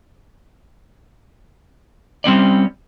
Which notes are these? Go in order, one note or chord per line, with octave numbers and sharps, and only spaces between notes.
G3 C4 C#4 D5